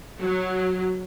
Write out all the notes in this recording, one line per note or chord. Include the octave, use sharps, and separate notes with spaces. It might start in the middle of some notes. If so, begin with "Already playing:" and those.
F#3